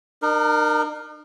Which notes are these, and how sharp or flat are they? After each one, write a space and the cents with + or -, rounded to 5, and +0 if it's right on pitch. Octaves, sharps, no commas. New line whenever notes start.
D#4 -45 A#4 +0